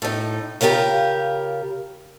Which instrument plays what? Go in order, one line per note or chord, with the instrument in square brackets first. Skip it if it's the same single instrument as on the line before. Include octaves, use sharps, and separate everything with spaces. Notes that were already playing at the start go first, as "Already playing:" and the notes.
[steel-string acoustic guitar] A2 D#4
C#3 E4 F4 G4 A#4